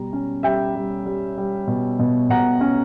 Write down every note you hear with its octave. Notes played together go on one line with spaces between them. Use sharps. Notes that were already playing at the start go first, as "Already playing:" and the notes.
Already playing: B2 G3 A#5
C#4
G3 E5 G5
G3
G3
G3
B2
B2
B2 F#5 A#5
C#4